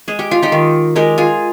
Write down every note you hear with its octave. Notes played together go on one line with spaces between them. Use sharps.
G#3 G#4
G4
F4
D#4 G4
D#3
G#3 G4 A#4
F4 G#4